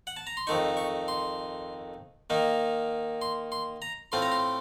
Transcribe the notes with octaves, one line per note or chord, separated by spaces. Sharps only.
F#5
A5
A#5
C6
F2 D#3 A3 D#4 C#6
C#6
C6
D#3 A#3 D#4
C6
C6
A#5
A2 A3 C4 F4 C6
A#5
C6